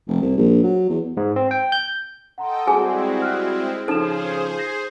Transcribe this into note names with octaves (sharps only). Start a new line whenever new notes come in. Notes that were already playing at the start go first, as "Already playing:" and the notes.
F1
C2
A#1
F#3
E2
G#2
C4
G5
G6
A4 D#5 F#5 G5 A#5 C6
G3 G#3 C4 E4 F#4 G#4 G#5
F6 F#6
C#3 F3 D#4 G#4 A4 C5 F6 E7
G6 A#6 C7